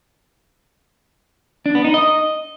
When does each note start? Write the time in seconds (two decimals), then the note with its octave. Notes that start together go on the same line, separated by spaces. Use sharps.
1.66 D4
1.75 B3
1.84 D#4
1.94 D#5